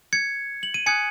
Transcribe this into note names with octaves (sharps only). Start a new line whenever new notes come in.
G#6 C#7
F#7
D#7
G#5 D#6 F#6 G#6 C#7